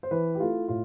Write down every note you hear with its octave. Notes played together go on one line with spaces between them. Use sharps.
C5
E3 B4
G4
A3 E4 F4
A2 F4